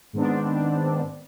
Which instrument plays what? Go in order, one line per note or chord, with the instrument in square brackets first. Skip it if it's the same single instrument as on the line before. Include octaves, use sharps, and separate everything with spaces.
[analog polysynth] G#2 D#3 B3 C4 D4